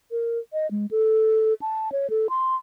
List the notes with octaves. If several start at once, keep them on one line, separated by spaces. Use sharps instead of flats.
A#4
D#5
G#3
A4
A5
C#5
A4
C6